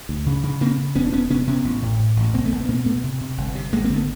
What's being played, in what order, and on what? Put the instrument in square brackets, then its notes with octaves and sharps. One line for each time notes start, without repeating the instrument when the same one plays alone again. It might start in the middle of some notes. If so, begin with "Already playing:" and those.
[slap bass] D2
C#3
C#3
C#3 A#3 C4
C#3
E1 B3 C#4
D4
E1 B3 C#4
C3 B3 C#4
C3 B3 C#4
A1
A2
A2
A1
C2 A#3 C4
A3 B3
C2
B3
B2 A#3 C4
B2 A3 B3
C3
C3
G1
C3
G#1 G#3 A#3
A#3 C4
D3
A3 B3